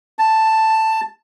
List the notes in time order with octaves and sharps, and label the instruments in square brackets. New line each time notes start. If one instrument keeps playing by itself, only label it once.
[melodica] A5